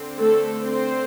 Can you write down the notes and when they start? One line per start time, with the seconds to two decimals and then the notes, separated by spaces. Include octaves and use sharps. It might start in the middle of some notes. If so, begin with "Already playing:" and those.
Already playing: D3 C4
0.17 A3 A4
0.63 C4 C5